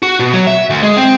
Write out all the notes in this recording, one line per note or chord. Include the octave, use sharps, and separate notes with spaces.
F#4
B2
F#3
E5
D2
G#3
C4